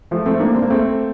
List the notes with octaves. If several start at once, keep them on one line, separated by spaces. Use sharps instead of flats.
F3 A3
A3 C4
A#3 D4
C4
A#3
A3 C4